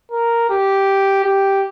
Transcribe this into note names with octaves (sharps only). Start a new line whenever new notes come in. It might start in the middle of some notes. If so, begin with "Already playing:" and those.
A#4
G4
G4